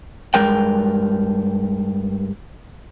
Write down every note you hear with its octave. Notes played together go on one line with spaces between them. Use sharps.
G2 G#3 A#4 G5